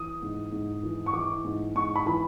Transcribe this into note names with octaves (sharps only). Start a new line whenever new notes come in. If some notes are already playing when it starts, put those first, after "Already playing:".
Already playing: E3 D#6
G#2
G#2
E3
C#6
E3 D6
G#2
G#2 C#6
B5
E3 B5